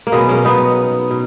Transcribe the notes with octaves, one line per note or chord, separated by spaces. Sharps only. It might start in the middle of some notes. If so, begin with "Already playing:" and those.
A#3
B2 F#3 G#3 B3
A#3 C#4
B3 D#4
B2